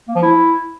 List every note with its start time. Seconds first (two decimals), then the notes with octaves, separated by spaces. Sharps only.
0.08 A#3
0.15 F3
0.23 E4